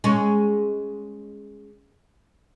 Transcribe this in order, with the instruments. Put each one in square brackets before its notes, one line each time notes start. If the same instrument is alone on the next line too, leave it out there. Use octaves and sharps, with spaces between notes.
[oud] G#3 C#4